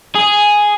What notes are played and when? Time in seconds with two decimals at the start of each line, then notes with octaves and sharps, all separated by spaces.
0.16 G#4